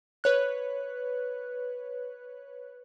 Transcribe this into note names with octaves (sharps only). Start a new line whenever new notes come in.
B4 C#5 F#6